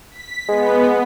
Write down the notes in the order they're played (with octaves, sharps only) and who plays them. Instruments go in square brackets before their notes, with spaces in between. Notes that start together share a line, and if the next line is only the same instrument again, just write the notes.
[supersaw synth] B6
[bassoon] G#3 [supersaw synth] B3